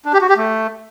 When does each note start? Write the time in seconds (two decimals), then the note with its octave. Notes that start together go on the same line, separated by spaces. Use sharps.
0.05 D4
0.13 G4
0.21 F#4
0.29 G4
0.37 A3